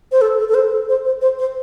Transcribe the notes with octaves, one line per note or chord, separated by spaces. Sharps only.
C5
A4
A4
A4
C5
A4
C5
C5
C5
C5